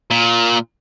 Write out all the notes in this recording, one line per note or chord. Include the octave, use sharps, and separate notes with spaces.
A#2